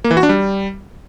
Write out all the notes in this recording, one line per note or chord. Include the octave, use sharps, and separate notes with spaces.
A#3
E3
F#4
D4
G3